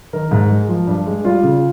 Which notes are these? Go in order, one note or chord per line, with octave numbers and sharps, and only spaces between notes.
D#3 A#4
G#2
G#3
F3
G2
G#3
G3 F4
C#3